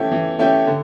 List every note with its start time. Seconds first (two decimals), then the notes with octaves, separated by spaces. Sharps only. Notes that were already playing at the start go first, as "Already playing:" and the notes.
Already playing: E3 A3 C#4 E4 G4
0.11 E3
0.39 A3 C#4 E4 G4
0.67 D3